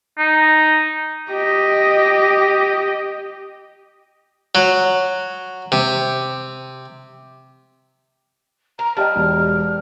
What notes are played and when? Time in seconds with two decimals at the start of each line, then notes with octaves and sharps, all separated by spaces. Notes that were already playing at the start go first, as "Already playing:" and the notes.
0.18 D#4
1.30 G4 D#5
4.55 F#3
5.72 C3
8.79 A#4 A#5
8.97 G3 D#5 G5 A5 F6
9.16 E1